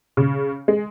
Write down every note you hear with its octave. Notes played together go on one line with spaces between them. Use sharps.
C#3
G#3